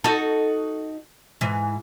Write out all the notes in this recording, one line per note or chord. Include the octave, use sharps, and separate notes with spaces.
D#4 F#4 A4
G#2 E3